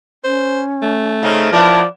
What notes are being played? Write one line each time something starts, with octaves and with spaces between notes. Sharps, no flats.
C#4 C5
A3
C#3 C4 C#4 D#4
F3 B3 E4 A#4 D5 A5